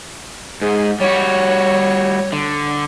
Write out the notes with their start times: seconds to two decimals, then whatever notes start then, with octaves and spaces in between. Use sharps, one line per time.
0.61 G#2 G#4
1.00 G3 F#4 C#5
2.33 D3